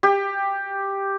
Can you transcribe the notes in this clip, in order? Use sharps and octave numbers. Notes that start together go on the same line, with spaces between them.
G4